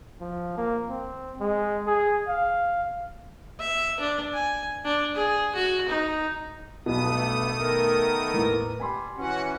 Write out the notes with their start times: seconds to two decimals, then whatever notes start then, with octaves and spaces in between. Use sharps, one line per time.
0.20 F3
0.57 A#3
0.89 C4
1.40 G#3
1.87 G#4
2.28 F5
3.59 E5
4.00 D4
4.33 G#5
4.85 D4
5.15 G#4
5.55 F#4
5.89 D#4
6.86 B1 G2 B2 A3 B3 D#6
7.58 D#3 B3 A#4
8.34 E2 A2
8.80 G3 G#5 B5 C6
9.18 E3 C#4 F#4 F#5